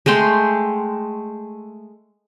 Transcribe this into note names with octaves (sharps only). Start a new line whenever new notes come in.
G#3 A3 G5 C6